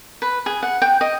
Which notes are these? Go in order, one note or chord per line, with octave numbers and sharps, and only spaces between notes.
B4
G#4
F#5
G5
D#5